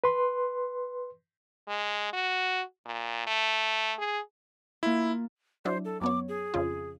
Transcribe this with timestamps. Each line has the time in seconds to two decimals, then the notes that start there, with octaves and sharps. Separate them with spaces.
0.04 B4 C6
1.68 G#3
2.13 F#4
2.86 A#2
3.27 A3
3.98 G#4
4.83 A#3 E4 F4
5.65 F#3 D4 E4 C5
5.85 A4
6.01 F#2 B3 C#5 D6
6.29 G#4
6.54 F2 C#3 F4